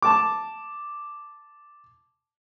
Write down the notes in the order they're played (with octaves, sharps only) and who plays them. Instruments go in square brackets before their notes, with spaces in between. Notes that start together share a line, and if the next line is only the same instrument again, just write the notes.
[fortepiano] A5 D6